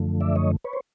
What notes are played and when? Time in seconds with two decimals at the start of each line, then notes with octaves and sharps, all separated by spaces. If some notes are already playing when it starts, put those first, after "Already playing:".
Already playing: F#2 D3 F3 A3
0.21 D5 E5
0.36 C#5 D#5
0.64 B4 C#5
0.73 C5